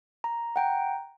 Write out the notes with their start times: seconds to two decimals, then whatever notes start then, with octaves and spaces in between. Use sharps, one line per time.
0.24 A#5
0.56 F#5 G5 A#5